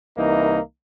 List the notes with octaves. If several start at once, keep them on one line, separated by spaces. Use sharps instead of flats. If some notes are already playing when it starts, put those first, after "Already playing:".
C2 E3 A#3 D#4